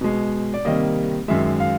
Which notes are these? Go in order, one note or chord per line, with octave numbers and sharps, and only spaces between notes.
B2 G#3
D5
C3 D#3 G3 A#3 D#5
F#2 D#3 G#3 E5
F5